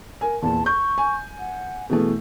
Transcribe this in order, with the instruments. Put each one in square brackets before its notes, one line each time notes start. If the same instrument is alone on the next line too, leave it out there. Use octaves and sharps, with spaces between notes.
[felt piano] A#4 G#5
[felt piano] E2 A#2 [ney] A5
[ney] C#6 [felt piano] G6
[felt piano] G#5
[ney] F#5
[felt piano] B2 E3 A3 [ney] G#4